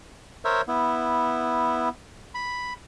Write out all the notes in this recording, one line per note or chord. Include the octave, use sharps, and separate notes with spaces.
A#4 C5 C#5 E5
B3 E4
B5